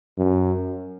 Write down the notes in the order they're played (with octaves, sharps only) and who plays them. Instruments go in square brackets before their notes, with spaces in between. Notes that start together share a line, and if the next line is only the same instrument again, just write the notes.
[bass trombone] F#2